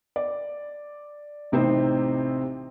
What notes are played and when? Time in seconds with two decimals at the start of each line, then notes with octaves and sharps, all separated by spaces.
0.16 D5
1.52 A1 C3 C4 D#4 C5